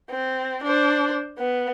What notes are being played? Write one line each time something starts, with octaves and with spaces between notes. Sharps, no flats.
C4
D4 C5
B3